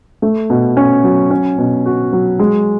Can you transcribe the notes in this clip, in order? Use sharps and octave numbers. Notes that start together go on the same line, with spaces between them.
A3
B2
C#4
F#3
C#4
B2
F#4
F#3
G#3